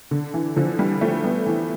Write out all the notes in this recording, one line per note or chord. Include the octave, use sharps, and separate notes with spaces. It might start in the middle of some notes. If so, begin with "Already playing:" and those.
D3
E3
D3 F3
E3 G3
F3 A3
G3 B3
E3